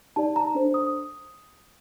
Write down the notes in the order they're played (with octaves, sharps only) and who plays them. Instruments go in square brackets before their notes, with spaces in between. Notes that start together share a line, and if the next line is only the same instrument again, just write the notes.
[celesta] D#4 G4 D5 A5
A#5
D4 A4 C5
D#6